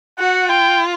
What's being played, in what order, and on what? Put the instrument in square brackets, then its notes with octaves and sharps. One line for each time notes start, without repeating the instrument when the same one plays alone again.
[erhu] F#4 [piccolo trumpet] F#5
[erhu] F4 [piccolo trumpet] G5